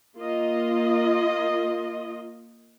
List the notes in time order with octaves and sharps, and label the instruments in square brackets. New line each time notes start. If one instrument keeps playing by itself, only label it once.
[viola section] A#3 F4 D#5